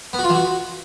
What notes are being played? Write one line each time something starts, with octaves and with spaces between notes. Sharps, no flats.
B3
F#4
F4
E3
F#4